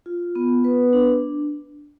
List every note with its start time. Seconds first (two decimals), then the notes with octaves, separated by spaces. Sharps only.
0.06 F4
0.36 B3
0.64 B4
0.93 D4